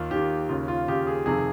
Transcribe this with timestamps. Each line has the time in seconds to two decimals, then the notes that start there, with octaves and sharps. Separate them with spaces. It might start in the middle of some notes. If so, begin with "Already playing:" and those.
Already playing: D#2 D#3 F4
0.11 D#2 D#3 G4
0.49 D#2 C#3 F4
0.68 F4
0.88 D#2 C#3 G4
1.07 G#4
1.26 F2 C3 D#3 G#4